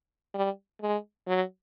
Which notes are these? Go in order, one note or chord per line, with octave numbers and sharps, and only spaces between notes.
G3
G#3
F#3